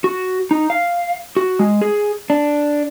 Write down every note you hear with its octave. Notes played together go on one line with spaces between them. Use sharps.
F#4
D#4
F5
F#4
G#3
G#4
D4